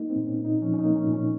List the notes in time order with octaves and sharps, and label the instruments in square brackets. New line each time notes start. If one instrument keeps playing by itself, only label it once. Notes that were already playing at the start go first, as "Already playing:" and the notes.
Already playing: [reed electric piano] A#3 D#4
C4
A#2
C#4
A#2
D#4
F3 C#4
C#4
D#4
A#3
C#4
A#2
C#4